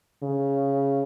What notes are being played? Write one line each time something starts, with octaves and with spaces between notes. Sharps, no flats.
C#3